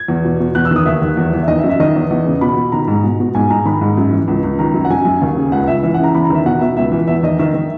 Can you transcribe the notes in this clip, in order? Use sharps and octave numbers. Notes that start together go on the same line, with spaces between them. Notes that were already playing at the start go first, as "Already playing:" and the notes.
Already playing: G#6
E2
B2
B2
E2 F#6
E6
D#3 D#6
D#2 E5
D#2
E2
E2
E5
D#3 D#5
E5
F#2
E5
D#3 D#5
E2
E2
C#3
B2 B5
B2
D#3 A#5
G#2
B2
B2
G#2 G#5
G#2 A#5
D#3 B5
G#2
F#2
E3
C#2
C#2
D#3 A#5
F#2
F#5
F#2 G#5
F#2
D#2
C#3
C#2 F#5
C#2 E5
E3 E5
F#5
C#3 A#5
E2 B5
A#5
D#3 E5
B2 F#5
B2 E5
C#2 E5
E3
E2 E5
D#3 D#5
D#3 E5
D#3